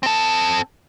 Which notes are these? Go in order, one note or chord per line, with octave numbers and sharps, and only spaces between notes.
C4 A4